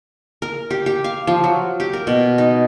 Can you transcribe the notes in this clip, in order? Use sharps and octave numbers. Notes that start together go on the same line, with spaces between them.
A#4
G4
G4
F5
F3
F#3
G4
A#4
B2
D#4